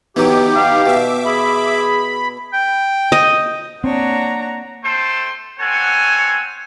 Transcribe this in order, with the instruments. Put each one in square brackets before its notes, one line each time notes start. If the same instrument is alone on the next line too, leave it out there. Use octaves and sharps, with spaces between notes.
[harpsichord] E3 F#3 [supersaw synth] B3 D#4 D6 [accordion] G4
[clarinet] F5
[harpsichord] B2 [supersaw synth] E5 D6
[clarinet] G#4 [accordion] B5
[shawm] G5
[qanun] D#5
[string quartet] A#3 D4 C#5 [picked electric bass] C4 [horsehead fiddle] F#5 A#5
[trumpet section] A3 A4 C5 G5 C6
B3 C4 A4 C#5 F#5 G#5